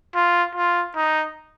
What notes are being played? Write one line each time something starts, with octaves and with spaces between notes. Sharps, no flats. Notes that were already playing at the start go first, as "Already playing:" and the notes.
F4
F4
D#4